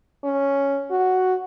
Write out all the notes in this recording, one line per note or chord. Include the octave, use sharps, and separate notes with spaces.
C#4
F#4